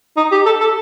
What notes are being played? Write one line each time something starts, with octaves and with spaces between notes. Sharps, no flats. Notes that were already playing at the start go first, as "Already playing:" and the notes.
D#4
G4
A4
A4